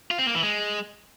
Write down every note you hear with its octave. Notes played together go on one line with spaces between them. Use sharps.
F4
C4
A#3
E3
G#3